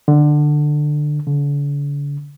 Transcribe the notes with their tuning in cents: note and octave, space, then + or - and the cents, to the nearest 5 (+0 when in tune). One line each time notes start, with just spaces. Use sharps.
D3 +15
D3 -45